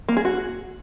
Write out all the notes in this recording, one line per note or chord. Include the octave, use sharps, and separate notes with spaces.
A#3
G#4
F#4